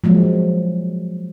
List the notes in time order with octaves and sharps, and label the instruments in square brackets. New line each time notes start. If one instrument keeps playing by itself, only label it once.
[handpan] F3 F#3 G#3 A#3